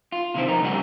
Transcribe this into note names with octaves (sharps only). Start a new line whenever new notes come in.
F4
C3 D#3 E3 D#4 E4 C5
F2 D#4 A#4
D2 G2 C#3 G3 A3 F#5